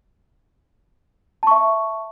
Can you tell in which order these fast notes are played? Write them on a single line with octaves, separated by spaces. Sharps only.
A5 C#6 E5